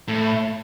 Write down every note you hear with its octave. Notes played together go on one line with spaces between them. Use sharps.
A2